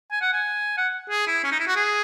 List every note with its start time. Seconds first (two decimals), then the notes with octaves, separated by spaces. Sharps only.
0.11 G#5
0.21 F#5
0.33 G#5
0.77 F#5
1.10 G#4
1.27 E4
1.44 C#4
1.52 D#4
1.60 E4
1.67 F#4
1.76 G#4